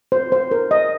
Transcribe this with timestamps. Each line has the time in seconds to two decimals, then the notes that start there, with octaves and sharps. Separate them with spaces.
0.12 C5
0.32 C5
0.51 A#4
0.71 D#5